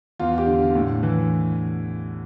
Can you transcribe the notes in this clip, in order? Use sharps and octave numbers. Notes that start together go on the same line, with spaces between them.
E2 F4
G4
D3
A2
E3